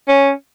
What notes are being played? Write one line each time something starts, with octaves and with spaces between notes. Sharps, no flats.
C#4